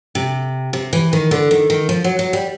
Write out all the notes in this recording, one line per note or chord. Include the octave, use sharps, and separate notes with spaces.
C3
C3
E3
D#3
D3
D#3
D#3
F3
F#3
F#3
G3